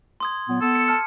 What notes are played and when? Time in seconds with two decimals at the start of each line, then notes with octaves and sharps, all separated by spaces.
0.20 C6 D#6 G#6
0.48 A#2 F#3 B3
0.61 B3 A4
0.75 C#7
0.88 A5 F6